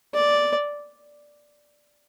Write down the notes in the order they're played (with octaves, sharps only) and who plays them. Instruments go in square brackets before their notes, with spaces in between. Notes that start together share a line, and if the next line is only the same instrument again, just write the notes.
[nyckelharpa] D5